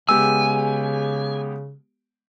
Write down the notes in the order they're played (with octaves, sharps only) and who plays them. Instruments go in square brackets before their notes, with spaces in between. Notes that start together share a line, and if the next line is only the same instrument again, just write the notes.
[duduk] C#3 [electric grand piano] G#3 B3 G4 [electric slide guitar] G#5 [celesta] E6